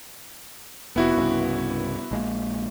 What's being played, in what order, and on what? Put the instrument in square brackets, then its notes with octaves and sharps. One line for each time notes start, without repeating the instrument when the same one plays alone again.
[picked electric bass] F1 [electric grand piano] B3 E4 F#4
[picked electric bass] C2 G2 C#3
A#1 G#3 A#3